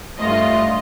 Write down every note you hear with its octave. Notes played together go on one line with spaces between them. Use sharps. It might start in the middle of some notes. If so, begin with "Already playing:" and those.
G2 A3 F4 D#5